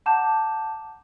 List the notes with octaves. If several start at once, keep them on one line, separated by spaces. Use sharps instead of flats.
F#5 A5 A#5 D6 G6 E7